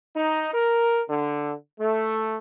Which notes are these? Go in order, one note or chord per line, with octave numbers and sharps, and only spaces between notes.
D#4
A#4
D3
A3